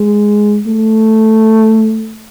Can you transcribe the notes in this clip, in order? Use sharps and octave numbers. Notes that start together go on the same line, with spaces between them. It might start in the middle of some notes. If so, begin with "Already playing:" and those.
Already playing: G#3
A3